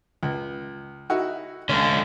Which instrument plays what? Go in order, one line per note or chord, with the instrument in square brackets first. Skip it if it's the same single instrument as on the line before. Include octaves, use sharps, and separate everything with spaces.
[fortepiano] C#2
D#4 E4 F#4
[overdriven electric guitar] C#2 D3 [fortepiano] C#4